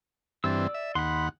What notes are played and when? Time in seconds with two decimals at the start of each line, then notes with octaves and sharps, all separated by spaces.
0.44 G2 E3 C4 D5 E6
0.74 E5
0.95 D#2 F#5 B5 C6